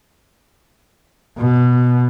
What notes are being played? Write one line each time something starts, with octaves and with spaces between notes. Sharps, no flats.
B2